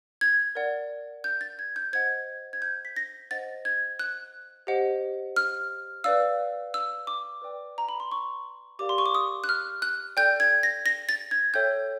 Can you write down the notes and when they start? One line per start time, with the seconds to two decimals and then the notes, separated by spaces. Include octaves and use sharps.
0.21 G#6
0.55 A#4 D5 F#5
1.24 G6
1.41 A6
1.59 G#6
1.76 G6
1.93 C5 D#5 F#5 G#6
2.53 G#6
2.62 G6
2.85 B6
2.96 A#6
3.31 C5 D#5 F#5 A6
3.65 G#6
3.99 F#6
4.67 G4 C5 D#5 F#5
5.36 F6
6.04 B4 D5 F5 E6
6.74 E6
7.07 D6
7.42 B4 D5 G5
7.78 A#5
7.89 B5
8.00 C6
8.12 C#6
8.79 G4 A#4 D5 F5 D6
8.89 C6
8.98 C#6
9.06 D6
9.15 D#6
9.44 F#6
9.49 F6
9.82 F#6
10.17 A4 D5 G5 G6
10.40 G#6
10.63 A#6
10.86 A#6
11.09 A6
11.31 G#6
11.54 A4 C#5 E5 G5 G6